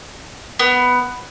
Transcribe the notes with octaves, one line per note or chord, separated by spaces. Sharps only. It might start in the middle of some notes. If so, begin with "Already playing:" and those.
B3